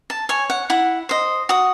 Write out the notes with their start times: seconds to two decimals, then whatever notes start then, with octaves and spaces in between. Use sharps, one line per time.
0.10 A5
0.29 C#5 G#5
0.50 F#5
0.70 E4 F#5
1.09 C5 D#5
1.49 F#4 D#6